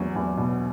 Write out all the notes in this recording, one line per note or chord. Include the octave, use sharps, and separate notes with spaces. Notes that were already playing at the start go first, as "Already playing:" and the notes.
Already playing: E2 F#3
E2
B2